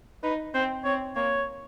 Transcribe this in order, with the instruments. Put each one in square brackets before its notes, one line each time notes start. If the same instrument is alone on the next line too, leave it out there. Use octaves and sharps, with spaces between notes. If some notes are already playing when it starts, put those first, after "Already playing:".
[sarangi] D#4 [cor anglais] B4
[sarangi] C4 [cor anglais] C5
[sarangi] C4 [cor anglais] C#5
[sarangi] A#3 [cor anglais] C#5